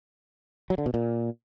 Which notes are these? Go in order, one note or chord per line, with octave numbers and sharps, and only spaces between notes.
F#3
D3
B2
A#2